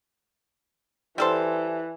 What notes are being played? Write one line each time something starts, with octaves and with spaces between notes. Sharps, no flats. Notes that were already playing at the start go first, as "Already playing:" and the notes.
E3 G3 A4 C5